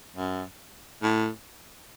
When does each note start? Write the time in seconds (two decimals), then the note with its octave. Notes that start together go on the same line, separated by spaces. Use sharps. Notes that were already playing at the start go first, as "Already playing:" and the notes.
0.16 F#2
1.03 A2